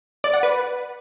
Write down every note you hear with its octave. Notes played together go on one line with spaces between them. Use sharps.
D5
F#5
B4